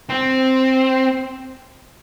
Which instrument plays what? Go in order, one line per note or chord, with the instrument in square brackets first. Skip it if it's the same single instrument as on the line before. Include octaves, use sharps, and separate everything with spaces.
[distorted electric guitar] C4